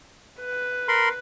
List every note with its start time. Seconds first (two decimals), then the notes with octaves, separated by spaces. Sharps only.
0.40 B4
0.88 A#4 B5 C6